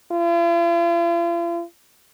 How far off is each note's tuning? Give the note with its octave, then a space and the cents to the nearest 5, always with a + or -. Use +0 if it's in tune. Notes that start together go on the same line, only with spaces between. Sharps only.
F4 -45